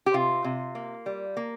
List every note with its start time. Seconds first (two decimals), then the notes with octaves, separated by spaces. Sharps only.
0.06 G4
0.14 C3 F4
0.44 C3
0.75 A#3
1.06 G3
1.37 A#3